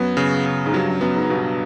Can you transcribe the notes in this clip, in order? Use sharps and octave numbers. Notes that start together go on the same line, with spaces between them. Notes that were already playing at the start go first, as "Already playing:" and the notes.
Already playing: F#2 F#3 B3
C#3
C#3
G#2
G2 F#3
F#2
F#2 B3
G#2
G2 B2